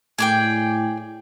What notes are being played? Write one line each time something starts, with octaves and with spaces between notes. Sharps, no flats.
A2 G#4 D5 G5